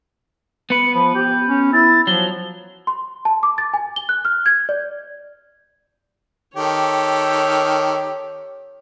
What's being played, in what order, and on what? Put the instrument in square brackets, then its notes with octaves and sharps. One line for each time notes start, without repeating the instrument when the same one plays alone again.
[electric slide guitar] B3 B4 [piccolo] C#7
[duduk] F3 [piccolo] B5
[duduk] G4 [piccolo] G6
[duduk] C#4
[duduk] E4 [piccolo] A6
[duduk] F3 [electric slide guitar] F#3 [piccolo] G7
[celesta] C6
A5
D6
A6
G#5
G7
F#6
F6
G#6
D5
[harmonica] D#3 G4 A4 [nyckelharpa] C#5